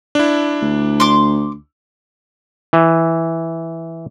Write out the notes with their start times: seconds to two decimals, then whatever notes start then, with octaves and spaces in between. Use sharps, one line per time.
0.15 D4 E4
0.62 D2
1.00 C6 D6
2.73 E3